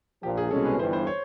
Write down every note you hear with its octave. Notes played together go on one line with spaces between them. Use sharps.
A#1 A#2 F3 G4
G#4
C2 B2 G#3 C#4 A4
B4
G1 G2 E3 C5
C5
C#5